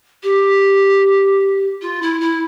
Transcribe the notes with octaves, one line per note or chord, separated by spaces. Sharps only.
G4
F4
E4
E4